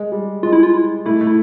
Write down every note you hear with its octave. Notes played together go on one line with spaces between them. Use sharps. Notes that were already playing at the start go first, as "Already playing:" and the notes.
Already playing: G#3
G3
G#3 F4
E4
F4
E4
A3 E4
A3
E4